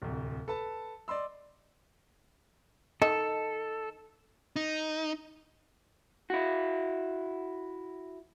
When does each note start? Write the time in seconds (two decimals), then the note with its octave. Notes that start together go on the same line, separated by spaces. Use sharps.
0.02 D1 C2
0.48 A4 B4 A5
1.08 D5 D#5 C6 E6
3.02 D#3 A4 D#5
4.56 D#4
6.30 E4 F#4